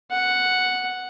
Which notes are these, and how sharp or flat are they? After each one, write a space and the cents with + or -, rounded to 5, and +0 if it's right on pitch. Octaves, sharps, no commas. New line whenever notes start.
F#5 +0